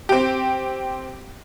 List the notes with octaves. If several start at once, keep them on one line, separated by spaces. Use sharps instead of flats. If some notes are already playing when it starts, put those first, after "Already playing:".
C4 G4